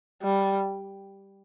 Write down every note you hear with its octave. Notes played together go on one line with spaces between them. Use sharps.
G3